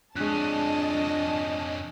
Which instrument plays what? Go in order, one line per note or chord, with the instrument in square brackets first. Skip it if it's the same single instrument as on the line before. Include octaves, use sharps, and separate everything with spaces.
[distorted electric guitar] F2 C#4 [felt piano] G#3 F#6 [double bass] D4 [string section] D#5 A5